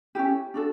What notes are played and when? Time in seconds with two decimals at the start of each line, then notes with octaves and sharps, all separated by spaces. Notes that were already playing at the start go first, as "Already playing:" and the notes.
0.15 C#4 E4 G4
0.54 D4 F#4 A4